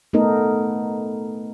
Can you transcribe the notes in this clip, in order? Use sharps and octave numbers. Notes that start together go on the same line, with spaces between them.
A3 B3 D#4 A4 A#4 D#5